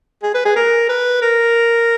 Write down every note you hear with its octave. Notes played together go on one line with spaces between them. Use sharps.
G#4
B4
G#4
A#4
B4
A#4